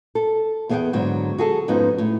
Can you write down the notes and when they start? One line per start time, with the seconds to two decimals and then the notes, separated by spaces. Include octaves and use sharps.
0.15 A4
0.69 E2 B3 G#4 D#5 F#5 G5
0.93 G#2 D3 F#3
1.38 F#4 G#4 A4
1.68 F2 G#2 B3 C#4 D#4
1.98 A2